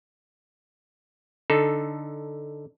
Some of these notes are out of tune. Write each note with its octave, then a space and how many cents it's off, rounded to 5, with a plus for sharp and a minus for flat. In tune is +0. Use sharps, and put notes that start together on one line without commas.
D3 +0 D#4 -5 A4 +0